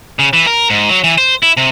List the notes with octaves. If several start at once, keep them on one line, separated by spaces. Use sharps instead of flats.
C#3
E3
A#4
G#2
F#3
E3
C5
E4
C3